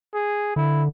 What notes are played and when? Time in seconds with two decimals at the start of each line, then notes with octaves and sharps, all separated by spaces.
0.14 G#4
0.56 D3 E4